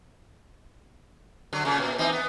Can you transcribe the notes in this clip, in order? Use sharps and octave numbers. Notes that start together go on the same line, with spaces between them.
D3 F#3
A#2 C#3
A#2
E3 C4 D#4
B3